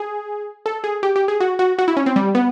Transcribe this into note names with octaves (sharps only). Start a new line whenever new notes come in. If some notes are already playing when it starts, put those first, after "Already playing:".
Already playing: G#4
A4
G#4
G4
G4
G#4
F#4
F#4
F#4
E4
C#4
C4
G3
B3